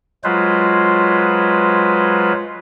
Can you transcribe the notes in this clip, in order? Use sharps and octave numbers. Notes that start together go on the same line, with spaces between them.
F#3 G#3 F4 B4 C5